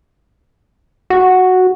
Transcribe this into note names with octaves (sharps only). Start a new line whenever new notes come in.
F#4 F#5